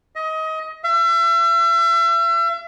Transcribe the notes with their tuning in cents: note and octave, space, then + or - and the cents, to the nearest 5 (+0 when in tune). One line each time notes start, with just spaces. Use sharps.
D#5 +25
E5 +40